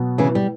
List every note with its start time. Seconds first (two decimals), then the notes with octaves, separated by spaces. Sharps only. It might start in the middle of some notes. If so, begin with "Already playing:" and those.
Already playing: B2 F#3 B3
0.18 C#3 E3
0.35 G3